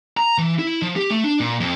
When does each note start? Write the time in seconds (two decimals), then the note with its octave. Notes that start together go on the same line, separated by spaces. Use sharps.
0.17 A#5
0.38 E3
0.59 E4
0.82 F3
0.96 G4
1.10 A3
1.24 D4
1.40 A#2
1.60 F2